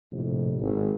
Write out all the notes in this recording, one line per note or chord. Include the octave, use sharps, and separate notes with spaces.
A#1 F2 A2 C3
G#1